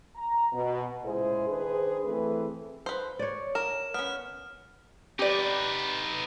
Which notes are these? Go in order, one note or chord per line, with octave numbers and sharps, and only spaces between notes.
A#5
B2
C#2 A#2 G#3 E4 G#4 C5
D#3 D4 G#4 B4 C5
E3 A3 C4 G#4 A4 B4
B4 C5
C#5 D5
A#4 E7
B3 C#4 F6
D#4 G4 B4 D5